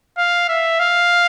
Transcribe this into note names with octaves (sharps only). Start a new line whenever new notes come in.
F5
E5
F5